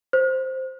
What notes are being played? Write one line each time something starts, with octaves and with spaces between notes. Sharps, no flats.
C5